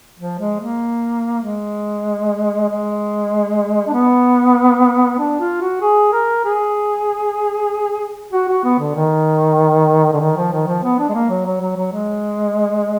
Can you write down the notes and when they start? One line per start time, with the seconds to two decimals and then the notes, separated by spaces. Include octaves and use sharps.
0.18 F3
0.39 G#3
0.60 A#3
1.43 G#3
2.69 G#3
3.87 D4
3.93 B3
5.19 D4
5.40 F4
5.61 F#4
5.82 G#4
6.13 A#4
6.45 G#4
8.32 F#4
8.48 F#4
8.64 B3
8.80 D3
8.95 D#3
10.13 D3
10.21 D#3
10.37 F3
10.52 D#3
10.67 F3
10.83 B3
10.99 D4
11.09 G#3
11.14 A#3
11.30 F#3
11.46 F#3
11.61 F#3
11.77 F#3
11.92 G#3